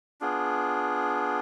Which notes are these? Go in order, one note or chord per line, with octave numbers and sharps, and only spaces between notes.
B3 D4 F4 G#4